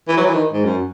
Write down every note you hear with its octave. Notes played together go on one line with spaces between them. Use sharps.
E3
F#3
E3
D#3
G#2
F#2